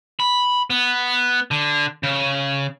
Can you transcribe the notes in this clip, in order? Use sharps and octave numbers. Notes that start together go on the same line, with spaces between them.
B5
B3
D3
C#3